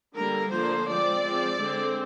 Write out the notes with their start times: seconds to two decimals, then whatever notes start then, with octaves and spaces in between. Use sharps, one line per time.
0.15 D3 G3 A#3 A#4
0.51 D3 F3 A#3 D4 C5
0.87 F3 G#3 C4 D5
1.23 F3 G#3 C4
1.59 D3 G#3 C4